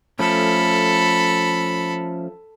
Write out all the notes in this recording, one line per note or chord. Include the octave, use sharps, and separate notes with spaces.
F3 A3 C#4 A4 B5